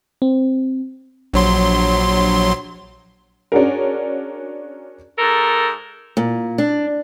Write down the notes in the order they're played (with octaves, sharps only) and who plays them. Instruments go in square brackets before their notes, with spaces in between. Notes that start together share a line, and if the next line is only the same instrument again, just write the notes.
[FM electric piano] C4
[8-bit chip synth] A#1 F#3 C6
[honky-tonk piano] C#4 D4 F#4 G#4 A#4
[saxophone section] G#2 A4 A#4
[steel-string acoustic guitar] A#2
D4